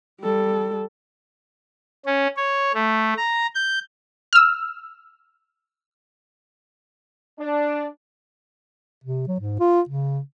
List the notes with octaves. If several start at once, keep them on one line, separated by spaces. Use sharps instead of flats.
G3 A4
C#4
C#5
A3
A#5
G6
E6 F6
D4
C3
F#3
G#2
F4
C#3